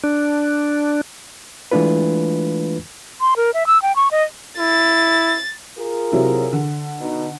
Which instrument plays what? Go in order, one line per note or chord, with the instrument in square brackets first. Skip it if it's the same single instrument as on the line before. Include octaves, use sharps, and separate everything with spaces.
[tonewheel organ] D4
[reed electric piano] E3 G#3 A3 D4 F4 B4
[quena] C6
A#4
E5
E6
G5
C#6
D#5
[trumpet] E4 [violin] A6
[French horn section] F4 G#4 A#4
[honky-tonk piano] C3 F#3 E4
D3
[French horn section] B2 D#4